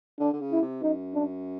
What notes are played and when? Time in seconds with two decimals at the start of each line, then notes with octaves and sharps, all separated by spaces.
0.20 D3 D4
0.33 D3
0.41 C#3
0.52 E4
0.62 C3
0.82 F#2 D#4
1.15 D4